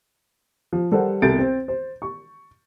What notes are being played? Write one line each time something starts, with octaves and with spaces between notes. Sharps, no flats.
F3
G3 A4 A#4 C5 F#5
C2 B2 A4 G6 A6 D7
C4
C5
C#6